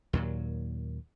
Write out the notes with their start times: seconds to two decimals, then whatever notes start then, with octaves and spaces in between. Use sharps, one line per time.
0.13 D#2 A#2 F#3